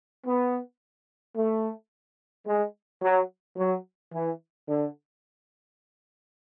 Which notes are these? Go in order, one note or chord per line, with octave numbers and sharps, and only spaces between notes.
B3
A3
G#3
F#3
F#3
E3
D3